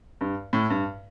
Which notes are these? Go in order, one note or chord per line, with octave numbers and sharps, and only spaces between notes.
G2
A2
G2